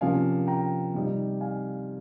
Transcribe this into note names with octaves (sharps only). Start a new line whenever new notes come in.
C3 F3 A#3 C#4 F5 G#5
G5 A#5
C3 G3 C4 D#4
F5 G#5